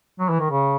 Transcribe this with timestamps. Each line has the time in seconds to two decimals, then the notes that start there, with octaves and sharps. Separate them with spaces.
0.19 F#3
0.29 E3
0.40 D#3
0.51 C#3